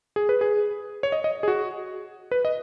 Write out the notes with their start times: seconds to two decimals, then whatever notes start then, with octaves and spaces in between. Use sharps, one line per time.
0.16 G#4
0.29 B4
0.41 G#4
1.03 C#5
1.12 D#5
1.24 D#5
1.43 G#4
1.48 F#4
2.31 B4
2.45 D#5